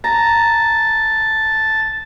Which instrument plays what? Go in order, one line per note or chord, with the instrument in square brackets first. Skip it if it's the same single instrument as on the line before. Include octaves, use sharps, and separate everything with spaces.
[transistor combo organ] A5 [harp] A#5